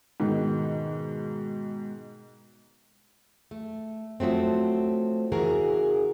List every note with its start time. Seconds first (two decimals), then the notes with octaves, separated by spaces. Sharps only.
0.20 G#2 B2 D#3 D#4
3.51 A3
4.20 F3 F#3 A3 C4
5.32 C#3 E3 F#4 G#4 A#4